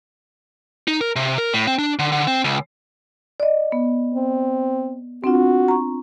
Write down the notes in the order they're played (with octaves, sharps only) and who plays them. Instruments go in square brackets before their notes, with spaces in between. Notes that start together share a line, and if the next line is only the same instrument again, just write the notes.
[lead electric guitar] D#4
A#4
C3
A#4
A2
C4
D4
D3
D3
C4
C#2
[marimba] D5 D#5
B3
[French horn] C4
[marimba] C4 D4 F4 [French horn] F#4
[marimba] A#5 C#6